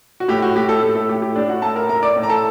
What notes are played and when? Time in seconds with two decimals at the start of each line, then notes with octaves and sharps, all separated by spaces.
0.20 F#4
0.28 A2 G4
0.42 F#4
0.56 A2 G4
0.68 A3 A4
0.82 A2 A3 A4
0.96 A3 A4
1.09 A2 G4
1.22 G4
1.35 A2 D4 D5
1.49 F#4 F#5
1.62 A2 A4 A5
1.76 A#4 A#5
1.89 A2 A#4 A#5
2.02 D5 D6
2.16 A2
2.23 A#5
2.29 A4 A5